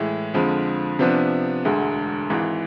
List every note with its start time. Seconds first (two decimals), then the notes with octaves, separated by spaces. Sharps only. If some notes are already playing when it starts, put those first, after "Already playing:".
Already playing: A2 E3 G#3
0.34 F2 D3 F3 G#3
0.99 C3 F3 B3 D4
1.65 E1 D2 D3 G#3
2.30 G#1 G#2 E3